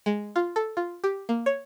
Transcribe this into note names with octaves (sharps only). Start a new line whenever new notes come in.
G#3
F4
A4
F4
G4
A#3
C#5